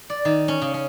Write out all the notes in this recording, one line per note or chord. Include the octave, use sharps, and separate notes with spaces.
D5
D#3
C#4
C#3
C#4